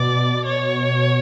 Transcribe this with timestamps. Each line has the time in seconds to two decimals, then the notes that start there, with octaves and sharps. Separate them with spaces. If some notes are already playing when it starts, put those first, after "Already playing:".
Already playing: B2 D5
0.46 C#5